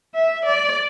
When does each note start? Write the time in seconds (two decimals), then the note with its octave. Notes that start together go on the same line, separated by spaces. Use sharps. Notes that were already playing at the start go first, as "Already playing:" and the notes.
0.15 E5
0.45 D5